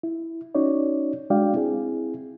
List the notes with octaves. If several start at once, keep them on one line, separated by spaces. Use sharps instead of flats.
E4
C#4 D#4 F#4 C#5 D5
G#3 D4 F#4 D5 F5 G5
C4 E4 G#4